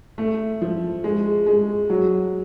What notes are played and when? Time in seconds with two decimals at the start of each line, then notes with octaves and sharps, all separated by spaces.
0.18 A3
0.62 F3
1.04 G#3
1.46 G#3
1.90 F#3